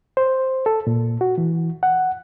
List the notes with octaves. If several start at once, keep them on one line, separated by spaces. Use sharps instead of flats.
C5
A4
A#2
F#4
E3
F#5